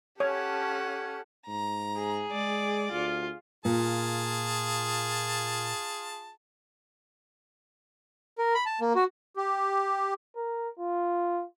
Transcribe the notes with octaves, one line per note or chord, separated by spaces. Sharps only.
C#4 G4 A4 C#5 F#5 A5
G#2 A#5
G#4
G#3 D5
D2 F4
A#2 F4 G#4 A5
A#4
B5
A5
A#3
F#4
G4
A#4
F4